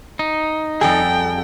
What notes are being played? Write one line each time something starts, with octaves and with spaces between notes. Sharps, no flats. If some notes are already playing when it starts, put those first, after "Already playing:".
D#4
F2 G3 G#4 A4 G5